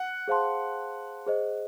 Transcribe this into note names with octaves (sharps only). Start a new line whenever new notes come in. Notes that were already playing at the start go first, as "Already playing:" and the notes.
Already playing: F#5
G#4 C5 F5 A5 C6
G#4 C5 D#5